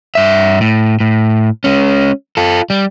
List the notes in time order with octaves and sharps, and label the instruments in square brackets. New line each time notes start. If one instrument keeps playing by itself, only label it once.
[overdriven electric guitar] G2 E5
A2
A2
G#3 C#4
F4 A4
G3